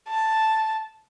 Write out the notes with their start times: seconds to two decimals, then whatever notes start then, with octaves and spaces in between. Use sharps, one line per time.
0.08 A5